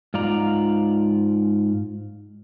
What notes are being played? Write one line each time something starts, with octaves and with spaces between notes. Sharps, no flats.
G#2 F4 D5 A#5